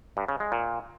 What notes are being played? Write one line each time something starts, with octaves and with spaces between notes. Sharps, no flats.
G2
C#3
G#3
A#2